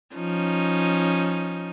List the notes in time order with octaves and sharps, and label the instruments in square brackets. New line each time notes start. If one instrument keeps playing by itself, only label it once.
[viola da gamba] F3 C#4 D#4